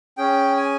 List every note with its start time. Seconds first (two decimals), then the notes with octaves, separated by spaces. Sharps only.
0.18 C#4 G#4 G5
0.57 G#5